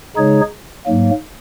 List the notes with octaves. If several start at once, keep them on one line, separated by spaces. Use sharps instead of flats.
C#3 G#3 D#4 G#4 C#5
G#2 F#3 A#3